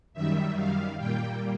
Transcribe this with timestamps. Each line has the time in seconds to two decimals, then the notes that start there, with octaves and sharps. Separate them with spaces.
0.14 F#2 D#3 G3 E5
0.56 F5
0.98 A#2 G3 A#3 G5